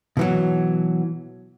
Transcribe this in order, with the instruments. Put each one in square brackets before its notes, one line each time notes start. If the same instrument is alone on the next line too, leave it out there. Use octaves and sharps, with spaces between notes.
[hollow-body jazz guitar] B2 E3 F#3